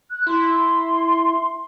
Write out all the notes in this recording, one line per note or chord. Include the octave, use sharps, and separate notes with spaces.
F#6
E4 C6